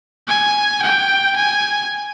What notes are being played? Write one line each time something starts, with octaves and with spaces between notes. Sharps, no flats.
G#5
G5
G#5